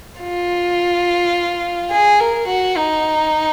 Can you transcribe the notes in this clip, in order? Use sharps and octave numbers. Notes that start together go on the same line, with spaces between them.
F4
G#4
A#4
F#4
D#4